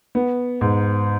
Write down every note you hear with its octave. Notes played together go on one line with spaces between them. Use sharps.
B3
G#2